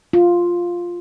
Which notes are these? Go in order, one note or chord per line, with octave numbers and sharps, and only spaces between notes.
F4